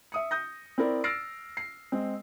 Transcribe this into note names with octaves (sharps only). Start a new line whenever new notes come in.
E5 D#6 C#7
D#6 G6 A#6
C4 E4 A#4 D5
E6 F6 A6 A#6 C7 D7
C7
G#3 C4